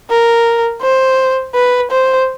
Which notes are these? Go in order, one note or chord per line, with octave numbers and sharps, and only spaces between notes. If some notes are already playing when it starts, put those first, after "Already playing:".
A#4
C5
B4
C5